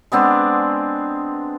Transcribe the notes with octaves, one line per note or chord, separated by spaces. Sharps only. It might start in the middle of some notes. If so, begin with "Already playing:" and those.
G#3 B3 C4 D4